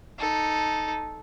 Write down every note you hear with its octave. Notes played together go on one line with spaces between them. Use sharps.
D#4 A4